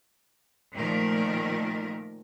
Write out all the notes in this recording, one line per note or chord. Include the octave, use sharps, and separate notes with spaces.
A#2 D#3 F3 A3 A#4